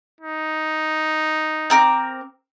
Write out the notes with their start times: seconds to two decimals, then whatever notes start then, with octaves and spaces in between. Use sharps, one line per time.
0.21 D#4
1.70 C4 A#4 D6